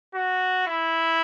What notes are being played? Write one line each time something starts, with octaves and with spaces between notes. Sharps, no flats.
F#4
E4